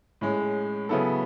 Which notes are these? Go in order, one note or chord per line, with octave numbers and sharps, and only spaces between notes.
A2 G#3 C#4
C#3 F#3 B3 E4 A4